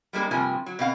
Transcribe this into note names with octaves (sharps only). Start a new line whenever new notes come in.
G3 G#3 A#3 D4
G2 C3 F3 A#3 G#5
F#3
B2 C4 F5 F#5